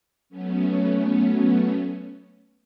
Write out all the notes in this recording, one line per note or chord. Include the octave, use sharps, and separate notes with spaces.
F#3 A3 B3 C#4